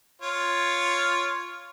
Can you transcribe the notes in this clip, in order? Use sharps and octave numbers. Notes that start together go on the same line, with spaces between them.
F4 C#5